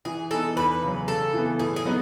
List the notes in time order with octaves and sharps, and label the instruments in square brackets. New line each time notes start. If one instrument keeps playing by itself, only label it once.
[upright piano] E3 [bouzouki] G#4
[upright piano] B3 D#4 G#4 [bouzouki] A4
[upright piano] E2 [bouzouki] B4
[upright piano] C#3 F#3
[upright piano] C#3 [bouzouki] A4
[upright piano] E3 B3
[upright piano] A2 [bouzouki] G#4
[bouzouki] G#4
[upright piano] F#3 B3 D#4